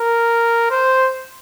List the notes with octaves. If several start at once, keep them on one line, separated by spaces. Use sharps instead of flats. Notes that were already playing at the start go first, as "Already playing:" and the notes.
Already playing: A#4
C5